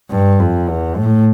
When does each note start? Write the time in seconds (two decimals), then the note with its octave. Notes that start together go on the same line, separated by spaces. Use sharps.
0.11 G2
0.40 F2
0.69 E2
0.97 A2